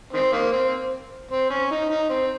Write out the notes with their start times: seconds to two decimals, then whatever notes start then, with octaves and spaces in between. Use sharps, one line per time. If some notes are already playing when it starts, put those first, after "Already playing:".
0.13 D#3 C4
0.33 D#3 A#3
0.52 C4
1.31 C4
1.50 C#4
1.71 D#4
1.90 D#4
2.10 C4